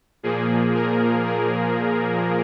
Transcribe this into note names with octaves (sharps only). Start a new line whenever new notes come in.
A#2 F3 A#3 G#4
A#4
G#4